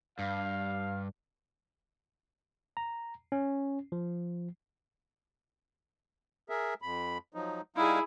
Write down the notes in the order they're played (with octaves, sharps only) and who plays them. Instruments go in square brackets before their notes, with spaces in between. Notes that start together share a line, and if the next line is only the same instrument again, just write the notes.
[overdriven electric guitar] G2 [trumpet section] F5
[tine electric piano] A#5
C#4
F3
[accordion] G#4 A#4 E5
F2 B5
F3 F#3 D#4
[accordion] G3 D#4 F5 [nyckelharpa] E4 G#4